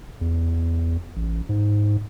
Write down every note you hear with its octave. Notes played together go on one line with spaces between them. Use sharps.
E2
A1
G#2